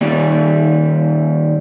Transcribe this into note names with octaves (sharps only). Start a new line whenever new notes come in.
D#2 A#2 G3